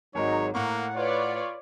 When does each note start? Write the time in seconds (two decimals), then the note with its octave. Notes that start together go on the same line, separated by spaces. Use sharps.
0.15 G#1 F#3 G#3 D#4 A#4 C#5
0.55 A2 A#3 F#5 A#5 C#6
0.96 F4 B4 C#5 D5